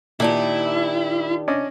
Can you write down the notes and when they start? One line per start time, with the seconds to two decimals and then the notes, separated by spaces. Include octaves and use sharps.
0.20 A#2 D#3 D4 E4 G4
1.48 C#4 D4 D#5